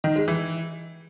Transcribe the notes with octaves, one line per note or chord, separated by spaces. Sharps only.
D#3
G#3
E3